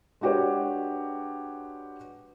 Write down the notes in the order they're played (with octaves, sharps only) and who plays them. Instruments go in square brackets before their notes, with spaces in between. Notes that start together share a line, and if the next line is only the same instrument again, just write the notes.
[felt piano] G#3 D4 F#4 G4 B4 C#5